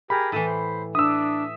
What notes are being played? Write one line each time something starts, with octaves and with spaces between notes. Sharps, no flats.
G4 G#4 A#4 B5
A2 E3 E5 A5 D#6
C5
D4 E5 D#6 E6